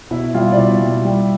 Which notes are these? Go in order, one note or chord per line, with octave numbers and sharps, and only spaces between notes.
B2 E4 E5
G3 F4 F5
D5
B2 E4 E5
G3
G3